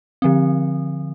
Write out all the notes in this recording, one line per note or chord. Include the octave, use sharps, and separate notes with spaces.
D3 F3 C4